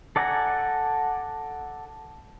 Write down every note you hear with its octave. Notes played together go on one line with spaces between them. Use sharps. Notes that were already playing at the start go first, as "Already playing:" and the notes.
A4 D5 F#5 G#5 A#5